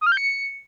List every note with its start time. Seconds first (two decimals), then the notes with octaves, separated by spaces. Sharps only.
0.01 D#6
0.07 F6
0.12 G6
0.17 C#7